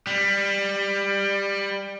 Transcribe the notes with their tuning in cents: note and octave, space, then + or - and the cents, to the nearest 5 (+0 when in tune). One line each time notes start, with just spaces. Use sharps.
G3 +15